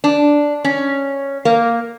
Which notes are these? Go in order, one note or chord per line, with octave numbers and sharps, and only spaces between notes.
D4
C#4
A#3